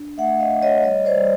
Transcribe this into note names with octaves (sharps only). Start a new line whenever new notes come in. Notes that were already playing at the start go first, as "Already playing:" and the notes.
Already playing: D4
A3 E5 F#5
D#5 F5
A3
C#5 D#5
G3 C#5 D#5
C5 D5
G3